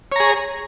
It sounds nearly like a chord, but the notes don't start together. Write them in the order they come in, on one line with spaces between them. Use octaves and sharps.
C#5 A#5 G#4